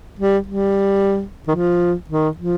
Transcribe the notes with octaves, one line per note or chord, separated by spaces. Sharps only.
G3
G3
D#3
F3
D#3
F3